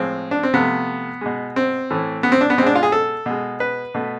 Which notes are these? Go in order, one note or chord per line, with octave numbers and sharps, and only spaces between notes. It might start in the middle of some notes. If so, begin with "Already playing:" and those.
Already playing: A2 F3 G#3 C4
D4
C4
C3 F3 A3 B3
B2 G#3
C4
A2 E3 A3
B3
C4
D4
B3
B2 G#3 C4 D4
F4
G#4
A4
B2 G#3
B4
B2 A3